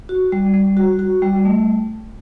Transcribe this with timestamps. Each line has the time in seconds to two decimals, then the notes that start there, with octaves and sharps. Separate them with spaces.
0.09 F#4
0.32 G3
0.54 G3
0.77 F#4
0.99 F#4
1.22 G3
1.45 A3